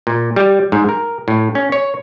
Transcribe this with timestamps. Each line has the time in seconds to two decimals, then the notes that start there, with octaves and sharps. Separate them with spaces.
0.07 A#2
0.36 G3
0.72 G#2
0.89 A#4
1.28 A2
1.55 C#4
1.72 C#5